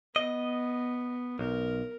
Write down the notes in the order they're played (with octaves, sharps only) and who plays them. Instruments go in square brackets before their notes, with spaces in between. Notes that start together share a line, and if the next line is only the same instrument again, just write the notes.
[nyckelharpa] B3 [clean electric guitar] D#5
[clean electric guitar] B1 [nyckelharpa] A#4